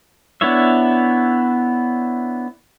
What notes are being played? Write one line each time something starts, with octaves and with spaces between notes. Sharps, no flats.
B3 D4 E4 C#5 E5